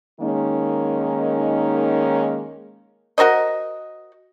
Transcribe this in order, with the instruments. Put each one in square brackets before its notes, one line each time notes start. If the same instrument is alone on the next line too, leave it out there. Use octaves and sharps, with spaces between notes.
[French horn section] D#3 G#3 A#3 C#4 D#4
[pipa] F#4 A#4 C5 D#5